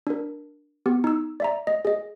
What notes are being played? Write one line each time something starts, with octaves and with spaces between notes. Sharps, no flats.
D4 A#4
B3 G4
D#4 E6
D5 E5 A#5
D#5
G#4 D#5